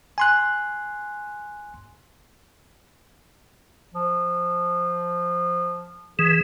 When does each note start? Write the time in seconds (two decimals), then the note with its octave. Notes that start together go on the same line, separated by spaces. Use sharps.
0.18 G#5 C6 F#6
3.94 F3
6.19 E3 G#4